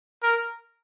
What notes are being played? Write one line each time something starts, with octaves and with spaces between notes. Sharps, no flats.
A#4